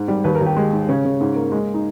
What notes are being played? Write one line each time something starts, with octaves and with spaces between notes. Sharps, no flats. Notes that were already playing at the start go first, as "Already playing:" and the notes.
Already playing: G#2
G3
D#2 B4
A#4
D#2
G4
G#3
G#2
C#3 C#4
C#3
G#2
A#3
G#3
D#4